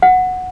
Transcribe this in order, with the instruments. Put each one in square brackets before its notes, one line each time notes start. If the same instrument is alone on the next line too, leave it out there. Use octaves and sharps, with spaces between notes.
[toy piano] F#5